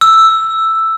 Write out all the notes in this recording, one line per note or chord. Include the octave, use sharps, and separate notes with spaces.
E6